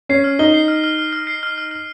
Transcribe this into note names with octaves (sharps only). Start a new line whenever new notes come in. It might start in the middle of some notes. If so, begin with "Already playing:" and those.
C#4 C7
F6
D#4 G7
C7
F6
F6
F6
F6
C7
F6
F6
F6